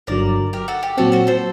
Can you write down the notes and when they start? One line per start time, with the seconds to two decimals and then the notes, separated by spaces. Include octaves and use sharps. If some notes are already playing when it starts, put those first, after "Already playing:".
0.07 G1 G2 D3 F#3 A#4 D5
0.53 G4 A#4
0.68 F#4 A4
0.83 G4
0.97 A#2 F#3 C4 F#4 A4
1.12 F#4 A4
1.27 A4 C5